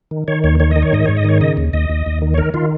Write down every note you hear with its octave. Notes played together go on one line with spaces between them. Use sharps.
D#3
D#3 C#5
D#2 C#5
D#3 C#5
D#3 D#5
C#5
G#2 D#5
G#2 C#5
D#5
D#3 C#5
C#3 D#5
D#2
D#2 D#5
D#2
D#2
D#3
C#5
D#3 A#4
D#3 F4